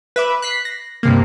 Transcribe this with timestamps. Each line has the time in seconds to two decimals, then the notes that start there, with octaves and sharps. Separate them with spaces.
0.16 B4 E5 D6
0.42 F#6 B6 C7
0.65 A#6
1.03 G2 C3 A#3